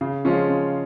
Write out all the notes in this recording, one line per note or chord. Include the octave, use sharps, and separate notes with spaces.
C#3
F3 G#3 C#4 F4
C#3